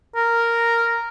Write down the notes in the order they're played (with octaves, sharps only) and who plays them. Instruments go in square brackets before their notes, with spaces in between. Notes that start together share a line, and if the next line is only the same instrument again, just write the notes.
[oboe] A#4